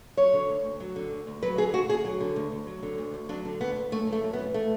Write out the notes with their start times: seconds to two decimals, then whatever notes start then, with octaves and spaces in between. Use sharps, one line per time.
0.17 F#3 C#5
0.33 D3
0.49 D2
0.65 D2
0.80 F#3
0.96 D3
1.11 D2
1.27 D2
1.43 F#3 B4
1.58 D3 G#4
1.74 D2 F#4
1.89 D2 G#4
2.05 F#3
2.21 D3
2.36 D2
2.52 D2
2.67 F#3
2.83 D3
2.98 D2
3.14 D2
3.29 F#3 D4
3.45 D3
3.61 D2 B3
3.76 D2
3.92 F#2 A3
4.07 E3
4.12 A3
4.23 F#2
4.33 B3
4.39 E3
4.54 A3